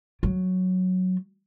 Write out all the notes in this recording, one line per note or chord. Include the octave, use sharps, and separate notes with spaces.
F#3